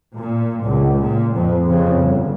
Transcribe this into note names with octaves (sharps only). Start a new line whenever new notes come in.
A#2
C#2
A#2
F2
F2 C#3
G1